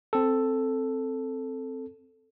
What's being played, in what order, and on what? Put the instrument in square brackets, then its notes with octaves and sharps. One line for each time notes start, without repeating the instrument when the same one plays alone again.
[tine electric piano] C4 A4